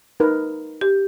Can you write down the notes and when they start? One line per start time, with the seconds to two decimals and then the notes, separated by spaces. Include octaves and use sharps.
0.20 D#4 A#4 B4
0.81 G4